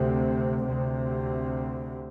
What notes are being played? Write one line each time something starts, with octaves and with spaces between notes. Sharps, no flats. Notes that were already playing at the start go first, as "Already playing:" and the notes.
Already playing: D2 C3
D2 C3